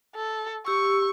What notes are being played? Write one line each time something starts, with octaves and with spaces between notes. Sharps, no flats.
A4
G4 C#6 E6